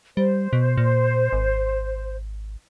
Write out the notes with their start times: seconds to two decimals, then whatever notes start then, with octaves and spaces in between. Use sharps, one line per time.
0.17 G3 C5
0.53 B2
0.78 A#2
1.33 G#1